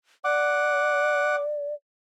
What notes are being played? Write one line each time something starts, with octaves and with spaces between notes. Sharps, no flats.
D5 F#5 D6